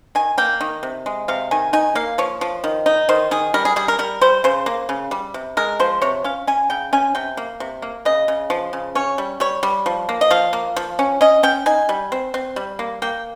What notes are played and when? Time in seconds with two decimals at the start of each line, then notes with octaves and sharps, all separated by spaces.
0.15 D#3 G#5
0.38 A#3 G5
0.61 D#3
0.83 C3
1.06 G#3
1.28 C3 F5
1.51 D#3 G#5
1.73 D#4 G#5
1.95 A#3 F5
2.18 F3 C#5
2.41 F3
2.64 D#3
2.86 D#4
3.09 D#3 C5
3.31 D#3 G#4
3.54 G3 A#4
3.65 G#4
3.76 G3 G#4
3.88 A#4
3.99 G3 A#4
4.21 G3 C5
4.44 C#3 C5
4.66 A#3
4.89 C#3
5.11 G3
5.34 C3
5.57 G#3 A#4
5.79 F3 C5
6.02 C3 C#5
6.24 C#4 F5
6.47 C#4 G#5
6.70 C#3 G5
6.93 C#4 G#5
7.15 C3 G5
7.37 A#3
7.60 C3
7.82 A#3
8.05 C#3 D#5
8.28 C#3
8.50 F3
8.73 C#3
8.95 C#4 C#5
9.18 G3
9.40 G3 C#5
9.63 G3
9.86 F3
10.09 A#3
10.21 D#5
10.31 F3 F5
10.53 A#3
10.76 F3
10.99 C#4
11.21 C#4 D#5
11.43 C#4 G5
11.66 D#4 G#5
11.89 G3
12.12 C4
12.34 C4
12.56 G3
12.79 A#3
13.02 A#3 G5